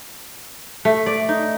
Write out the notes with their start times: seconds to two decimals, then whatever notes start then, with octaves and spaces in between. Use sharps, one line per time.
0.85 A3
1.06 D5
1.29 D#4